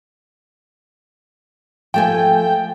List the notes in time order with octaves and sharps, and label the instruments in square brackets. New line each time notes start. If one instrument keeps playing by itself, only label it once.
[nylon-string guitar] F3 A3 G#5 [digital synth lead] G5